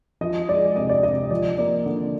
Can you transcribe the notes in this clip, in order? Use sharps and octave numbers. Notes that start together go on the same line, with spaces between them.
F3 D#5
G#3 D5
C3 D#5
D5
C3 D#5
F3 D5
A#3 D5
D3